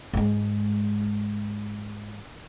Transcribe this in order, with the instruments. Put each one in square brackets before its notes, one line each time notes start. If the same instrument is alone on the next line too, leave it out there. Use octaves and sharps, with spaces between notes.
[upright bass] G#2 G#3